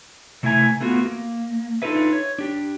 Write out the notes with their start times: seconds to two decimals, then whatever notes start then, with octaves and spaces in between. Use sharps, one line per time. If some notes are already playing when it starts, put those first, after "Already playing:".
0.43 C3 A3 E4 E5 G#5 A#5
0.81 A3 B3 F4 F#4
1.05 A#3
1.82 D4 D#4 F4 A4 B4 E5
2.13 C#5
2.39 D4 G4